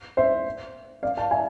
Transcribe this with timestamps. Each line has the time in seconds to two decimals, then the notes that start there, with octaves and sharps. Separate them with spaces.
0.17 C5 E5
1.03 D5 F5
1.17 F5 A5
1.31 E5 G#5